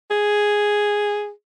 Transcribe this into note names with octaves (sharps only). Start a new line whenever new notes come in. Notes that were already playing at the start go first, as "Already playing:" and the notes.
G#4